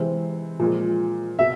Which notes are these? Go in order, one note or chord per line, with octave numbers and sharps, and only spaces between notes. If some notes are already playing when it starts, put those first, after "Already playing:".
Already playing: C3 E3 G#3 C4
A#2 F3 G#3
B2 E5